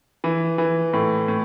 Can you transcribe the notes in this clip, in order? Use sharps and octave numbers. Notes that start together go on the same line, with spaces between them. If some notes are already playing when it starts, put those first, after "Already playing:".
E3
E3
A2
A2